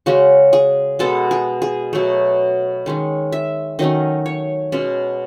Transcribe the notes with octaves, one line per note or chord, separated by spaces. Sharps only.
C#3 G#3 C#4 F#4
G#4
B2 G#3 B3 A4
G#4
G#4
B2 F#3 A3
D#3 G#3 C#4
E5
D#3 F#3 A3 C#4 D#5
C#5
B2 G#3 C#4